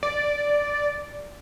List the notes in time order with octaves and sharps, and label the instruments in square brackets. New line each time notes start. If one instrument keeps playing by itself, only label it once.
[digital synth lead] D5